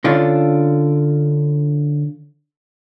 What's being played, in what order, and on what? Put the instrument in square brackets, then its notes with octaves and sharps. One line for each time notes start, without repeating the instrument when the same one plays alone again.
[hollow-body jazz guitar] D3 C#4 D4 F4